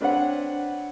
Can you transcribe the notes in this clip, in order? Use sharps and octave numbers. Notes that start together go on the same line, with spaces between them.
C4 D4 B4 C#5 F#5